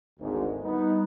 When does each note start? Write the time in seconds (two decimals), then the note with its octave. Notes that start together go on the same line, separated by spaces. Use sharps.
0.20 G#1 D2 G#2
0.62 G3 B3 D#4